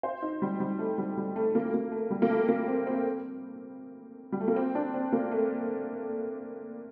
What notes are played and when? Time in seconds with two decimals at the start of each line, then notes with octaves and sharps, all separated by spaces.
0.03 C5
0.22 D#4
0.42 G3
0.60 G3
0.79 A3
0.98 G3
1.17 G3
1.36 A3
1.55 A#3
1.66 A3
1.74 A#3
1.92 A3
2.10 G3
2.22 A#3
2.30 A3
2.49 A#3
2.68 C4
2.87 C4
4.32 G3
4.41 A3
4.48 A#3
4.56 C4
4.75 D4
4.94 C4
5.13 A#3
5.32 A3